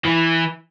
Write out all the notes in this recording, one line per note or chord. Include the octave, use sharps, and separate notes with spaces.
E3